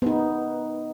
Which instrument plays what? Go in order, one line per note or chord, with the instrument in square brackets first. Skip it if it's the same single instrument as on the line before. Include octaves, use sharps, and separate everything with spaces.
[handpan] B3 D#4